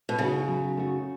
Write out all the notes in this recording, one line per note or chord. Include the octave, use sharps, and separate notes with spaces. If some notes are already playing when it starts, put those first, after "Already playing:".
B2
C#3 A3 D#4 F#4
F#3
A3 D#4 F#4